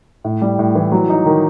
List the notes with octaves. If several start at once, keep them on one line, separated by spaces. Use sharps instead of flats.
A2
G3
A2
E3
F#3
D#4
D#3